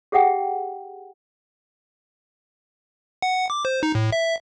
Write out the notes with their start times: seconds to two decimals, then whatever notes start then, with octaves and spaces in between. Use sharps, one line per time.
0.12 G4 G#4 E5 F#5 G5
3.22 F#5
3.50 D6
3.65 C5
3.83 D#4
3.95 A2
4.12 E5